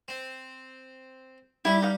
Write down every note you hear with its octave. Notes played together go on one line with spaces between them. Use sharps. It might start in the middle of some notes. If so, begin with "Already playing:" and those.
C4
G3 E4 G4
D#4 F5